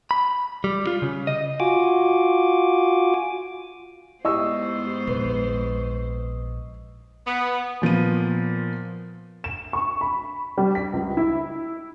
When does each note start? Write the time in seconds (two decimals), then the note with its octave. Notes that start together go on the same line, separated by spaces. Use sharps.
0.11 B5
0.64 G3
0.87 F4
1.02 C#3
1.27 D#5
1.60 F4 F#4 G#5 D6
4.25 G#2 B3 E4 G4 C5 D#5 C#6 E6
5.07 A#1 E2 B4
7.26 B3
7.82 A#2 F3 B3 D#7
9.44 E7
9.73 C#6
10.01 B5
10.58 G3
10.75 B6
10.93 C#2
11.17 E4